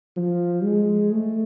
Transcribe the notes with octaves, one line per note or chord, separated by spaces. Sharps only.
F3
G#3
A3